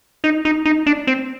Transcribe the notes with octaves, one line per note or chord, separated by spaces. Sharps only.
D#4
D#4
D#4
D4
C4